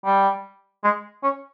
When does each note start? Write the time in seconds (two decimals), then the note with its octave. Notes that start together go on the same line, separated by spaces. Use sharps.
0.05 G3
0.84 G#3
1.23 C#4